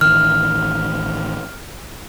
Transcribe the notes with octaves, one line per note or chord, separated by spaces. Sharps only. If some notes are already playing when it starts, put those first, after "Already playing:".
A1 D#3 F6